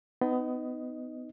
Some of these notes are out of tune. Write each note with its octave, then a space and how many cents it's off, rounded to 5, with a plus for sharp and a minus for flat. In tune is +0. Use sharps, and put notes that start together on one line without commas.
B3 +30 D#4 +0 D#5 +0